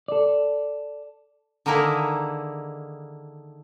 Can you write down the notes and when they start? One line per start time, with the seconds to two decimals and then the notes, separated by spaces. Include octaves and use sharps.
0.08 A4 D5
1.66 D3 D#3 A#3 D#4 E4 G#4